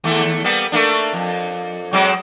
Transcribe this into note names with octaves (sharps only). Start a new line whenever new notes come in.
D#2 A3
G3 A#3 B3
A3 A#3 D4
F2
F#3 G#3 C4